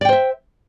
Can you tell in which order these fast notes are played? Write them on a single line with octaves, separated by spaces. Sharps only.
D5 G5 C5 E5